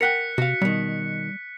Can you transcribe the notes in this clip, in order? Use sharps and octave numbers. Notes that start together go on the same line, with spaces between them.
A#4 F#5 G5 F#6 B6 C#7
C3 F#4 F5
B2 D#3 G3